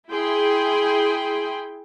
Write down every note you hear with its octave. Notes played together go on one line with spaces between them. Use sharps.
E4 G#4 G5 C6